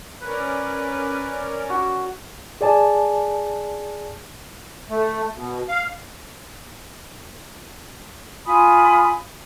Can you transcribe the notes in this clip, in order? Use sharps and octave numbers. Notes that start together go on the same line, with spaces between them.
C#4 A#4 B4 D5
F#4
G#4 D5 G#5 A5
A3
B2
F5
F4 G#5 B5 D#6